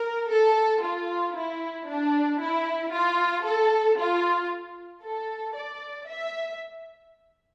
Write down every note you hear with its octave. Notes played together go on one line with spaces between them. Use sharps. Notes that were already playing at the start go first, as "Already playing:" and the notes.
Already playing: A#4
A4
F4
E4
D4
E4
F4
A4
F4
A4
D5
E5